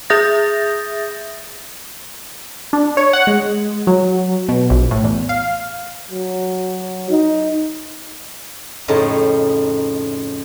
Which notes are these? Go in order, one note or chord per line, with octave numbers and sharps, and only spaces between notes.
G#4 E5 D#6 G6 A6 A#6
D4
C#5
F#5
G#3
F#3
B2
A#1
A2
E2
F5
F#3
D#4
F2 A2 C#3 A3 D#4